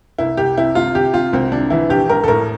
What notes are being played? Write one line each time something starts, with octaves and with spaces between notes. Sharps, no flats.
C2 E4
C2 G4
C3 E4
C3 F4
C3 G4
C3 F4
C2 C4
C3 D4
E3 E4
A#1 G4
A#1 A#4
A4
A2 A#4